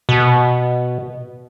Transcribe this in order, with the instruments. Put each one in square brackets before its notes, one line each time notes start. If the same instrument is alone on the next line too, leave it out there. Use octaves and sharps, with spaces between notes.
[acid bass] B2